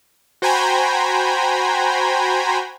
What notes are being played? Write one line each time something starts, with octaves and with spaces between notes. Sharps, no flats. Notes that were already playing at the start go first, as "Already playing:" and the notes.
F#4 C5 G5 G#5 A#5 B5